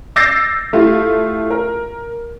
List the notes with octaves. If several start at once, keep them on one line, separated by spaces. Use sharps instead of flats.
D6 E6 G6 A6 A#6 C7
A3 E4 F4 G4
A#4